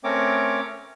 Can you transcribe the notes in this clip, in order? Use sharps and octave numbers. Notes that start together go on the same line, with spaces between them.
A3 C4 C#4 A#4 C#5 D6